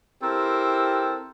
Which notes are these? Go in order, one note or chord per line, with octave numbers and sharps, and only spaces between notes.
C4 E4 G4 A4 A#4 C5